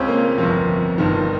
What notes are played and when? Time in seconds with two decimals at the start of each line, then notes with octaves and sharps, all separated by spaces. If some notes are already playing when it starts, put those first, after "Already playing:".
Already playing: C#2 C#3 C4 C#4
0.08 A#3
0.38 G1 F2 C3
0.98 G1 G2 D#3